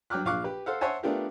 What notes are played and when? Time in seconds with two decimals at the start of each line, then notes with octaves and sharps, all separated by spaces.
0.10 G2 F#3 G5 D6 F6 F#6
0.25 A#1 F4 F5 C#6 D6 F#6
0.44 G4 B4
0.66 A4 C5 F5 F#5
0.81 C5 C#5 E5 F#5 G#5 A5
1.03 A3 B3 D4 F4 G4 A#4